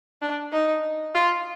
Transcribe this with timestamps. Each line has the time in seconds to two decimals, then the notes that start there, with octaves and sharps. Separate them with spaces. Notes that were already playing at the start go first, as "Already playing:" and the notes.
0.22 D4
0.52 D#4
1.15 F4